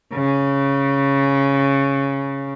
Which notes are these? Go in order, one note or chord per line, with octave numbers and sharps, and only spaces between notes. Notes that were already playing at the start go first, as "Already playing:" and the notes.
C#3